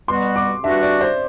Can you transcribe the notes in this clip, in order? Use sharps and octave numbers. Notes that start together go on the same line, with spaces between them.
B2 G3 B3 F#4 C6
D6
G2 E3 G3 D4 F#4 E5
D5
C5